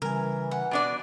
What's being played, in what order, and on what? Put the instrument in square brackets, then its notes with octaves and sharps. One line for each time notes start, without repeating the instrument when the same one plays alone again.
[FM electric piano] C#3 G3 G#5 [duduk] E3 [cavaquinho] A#4
[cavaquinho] F#5
[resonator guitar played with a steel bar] B2 D4 D5